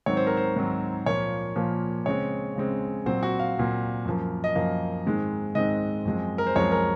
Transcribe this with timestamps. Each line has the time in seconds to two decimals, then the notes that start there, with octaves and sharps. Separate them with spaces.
0.06 G#2 D#3 F#3 C4 C#5
0.17 C5
0.27 A#4
0.37 C5
0.56 G#2 D#3 F#3 C4
1.06 A#2 F3 A#3 C#5
1.56 A#2 F3 A#3
2.06 C#3 G#3 C4 C#5
2.56 C#3 G#3 C4
3.06 A#2 F#3 C4 C5
3.23 F#4
3.40 F5
3.56 A#2 F#3 C4
4.05 F#2 F3 A#3
4.44 D#5
4.55 F#2 F3 A#3 F5
5.06 G#2 D#3 G#3 C4
5.55 G#2 D#3 G#3 C4 D#5
6.05 F#2 F3 G#3 C4
6.38 A#4
6.47 C5
6.55 F#2 F3 G#3 C4 C#5
6.72 A#4